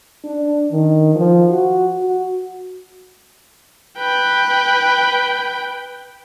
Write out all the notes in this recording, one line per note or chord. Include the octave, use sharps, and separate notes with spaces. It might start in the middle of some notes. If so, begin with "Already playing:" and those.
D4
D#3
F3
F#4
F#4
B4 G5